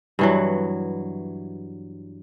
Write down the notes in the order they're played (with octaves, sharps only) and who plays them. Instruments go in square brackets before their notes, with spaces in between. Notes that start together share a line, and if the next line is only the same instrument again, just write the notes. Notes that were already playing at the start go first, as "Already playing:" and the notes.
[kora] G2 E3 F#3